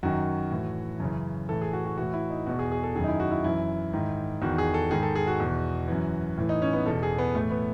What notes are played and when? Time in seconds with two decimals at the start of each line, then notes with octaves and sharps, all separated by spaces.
0.03 F#2 D#3 F#4
0.51 A2 E3
1.00 F#2 C#3 E3
1.49 A2 E3 A4
1.61 G#4
1.73 F#4
1.85 F#4
1.97 A2 E3 F#4
2.13 E4
2.30 D#4
2.47 E2 B2 F#4
2.59 G#4
2.72 G#4
2.83 A4
2.95 F#2 D#3 G#4
3.04 D#4
3.08 E4
3.20 F#4
3.31 E4
3.44 F#2 E3 E4
3.93 G#2 D#3
4.42 E2 D#3 F#4
4.58 G#4
4.74 A4
4.91 G#2 D#3 G#4
5.03 A4
5.15 G#4
5.27 F#4
5.40 E2 B2
5.88 F#2 E3
6.37 A2 E3
6.49 D#4
6.62 C#4
6.73 B3
6.86 E2 B2 A4
7.03 G#4
7.18 B3
7.35 A2 E3 A3
7.51 B3